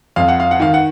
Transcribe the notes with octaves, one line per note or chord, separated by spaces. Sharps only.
F2 F5
F#5
F5
F#5
D#3 F5
F#5